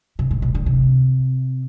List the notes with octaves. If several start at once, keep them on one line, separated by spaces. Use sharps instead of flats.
C3
A2
B2
D3
C3